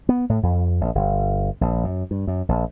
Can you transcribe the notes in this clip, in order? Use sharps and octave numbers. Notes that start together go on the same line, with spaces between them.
B3
A2
F2
A#1
G1
A#1
F#2
G2
F#2
A#1